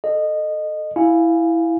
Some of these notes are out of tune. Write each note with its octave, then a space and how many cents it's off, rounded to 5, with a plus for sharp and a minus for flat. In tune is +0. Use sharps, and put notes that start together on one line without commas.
A4 +0 D#5 -20
E4 +0 F5 +0 G#5 +0